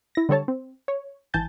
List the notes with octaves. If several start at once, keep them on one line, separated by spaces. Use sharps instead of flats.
E4 A#6
D3 G3 A4 C#5 A5
C4
C#5
G#1 E3 G#5 A5 G6 A6